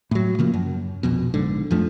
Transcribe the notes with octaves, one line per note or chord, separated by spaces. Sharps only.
A2 F#3
C#3 F3 A#3
F#2
A#1 F2 B2
A#1 G#2 D3
F2 F3 A3 D4